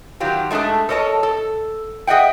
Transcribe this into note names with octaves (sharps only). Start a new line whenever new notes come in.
D#3 F#3 F4 G4
G#3 A3 D4 G#4 A4
A4 A#4 C#5 D#5 A5
A4
G#4 D#5 E5 F#5 G5